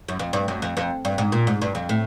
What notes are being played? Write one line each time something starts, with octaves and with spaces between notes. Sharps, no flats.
F#2
F2
G2
F#2
F2
F2
G2
G#2
A#2
G#2
G2
F2
A2